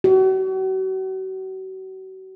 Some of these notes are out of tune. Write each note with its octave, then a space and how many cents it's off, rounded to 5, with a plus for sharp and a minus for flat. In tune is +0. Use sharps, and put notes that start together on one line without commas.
F#4 +40